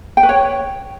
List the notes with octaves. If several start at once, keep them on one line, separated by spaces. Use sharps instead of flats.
G5
B4
C#5